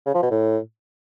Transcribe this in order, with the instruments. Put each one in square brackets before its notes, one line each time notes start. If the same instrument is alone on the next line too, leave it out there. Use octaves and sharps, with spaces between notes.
[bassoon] C#3
F3
B2
A2